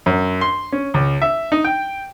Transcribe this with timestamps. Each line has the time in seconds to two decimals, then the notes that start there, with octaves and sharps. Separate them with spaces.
0.06 F#2
0.41 C6
0.72 C#4
0.94 C#2
1.22 E5
1.52 D#4
1.64 G5